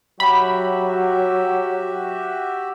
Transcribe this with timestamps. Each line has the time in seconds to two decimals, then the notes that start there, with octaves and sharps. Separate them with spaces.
0.20 F#3 F#4 G4 E5 B5